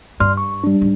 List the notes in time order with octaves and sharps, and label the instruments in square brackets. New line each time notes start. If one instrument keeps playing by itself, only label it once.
[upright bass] G2 [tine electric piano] D5 C6 F6
[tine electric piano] C#6
G3 D4
[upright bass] G#2